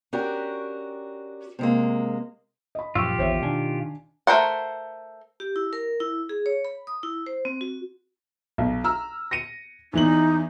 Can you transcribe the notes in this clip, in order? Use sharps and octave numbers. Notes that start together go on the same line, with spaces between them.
C#4 D4 F#4 G4 A#4
C3 G#3 A#3
D#5 B5
F#2 A#2 F3 F4 G4 C#6 E6
A1 E2 D#3 C5 C#5 E5
B2 D#3 D4 G#5
A3 A#4 C5 F#5
G4
E4
A#4
E4
G#4
C#5
B5
D#6
E4
C5
C4
F#4
B1
A#5 E6 F6
A#6 C#7 D#7
E2 E3 D#4 F#7